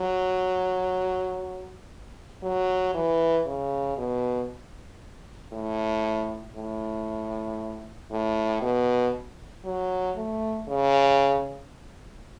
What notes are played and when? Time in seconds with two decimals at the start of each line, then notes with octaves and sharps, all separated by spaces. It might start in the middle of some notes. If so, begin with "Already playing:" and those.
Already playing: F#3
2.43 F#3
2.94 E3
3.47 C#3
3.98 B2
5.53 A2
6.56 A2
8.11 A2
8.62 B2
9.65 F#3
10.16 A3
10.69 C#3